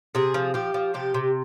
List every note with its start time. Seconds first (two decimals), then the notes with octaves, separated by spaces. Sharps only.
0.15 C3 G#4
0.34 F3
0.54 F3 G4
0.74 F3
0.94 C3 G4
1.14 C3